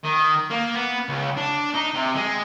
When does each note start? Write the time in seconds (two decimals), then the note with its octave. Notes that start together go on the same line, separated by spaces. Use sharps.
0.04 D#3
0.51 A#3
0.75 B3
1.09 C#2
1.37 D4
1.75 D#4
1.95 C3
2.16 G#3